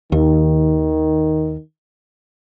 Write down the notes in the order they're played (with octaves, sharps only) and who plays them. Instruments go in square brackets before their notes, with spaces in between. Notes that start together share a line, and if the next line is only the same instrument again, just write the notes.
[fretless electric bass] D#2 [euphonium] D#3